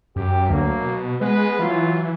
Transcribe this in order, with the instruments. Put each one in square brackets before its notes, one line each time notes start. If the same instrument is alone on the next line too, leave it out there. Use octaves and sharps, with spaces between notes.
[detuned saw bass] F#2 [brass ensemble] G4
[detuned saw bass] D2 [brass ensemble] F#3 A#3
[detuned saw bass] B2
[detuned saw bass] G#3 [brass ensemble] B3 B4
[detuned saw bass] E3 [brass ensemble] F#3 F4